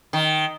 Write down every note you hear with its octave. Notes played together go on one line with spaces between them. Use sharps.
D#3